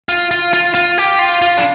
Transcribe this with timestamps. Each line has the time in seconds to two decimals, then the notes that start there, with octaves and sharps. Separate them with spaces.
0.09 F4
0.31 F4
0.53 F4
0.75 F4
0.98 G4
1.19 F4
1.42 F4
1.58 D4